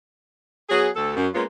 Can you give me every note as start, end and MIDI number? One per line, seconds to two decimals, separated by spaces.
0.70 0.89 54
0.70 0.89 59
0.70 0.89 68
0.96 1.12 38
0.96 1.12 69
1.16 1.28 42
1.34 1.44 56
1.34 1.44 58
1.34 1.44 59
1.34 1.44 61
1.34 1.44 65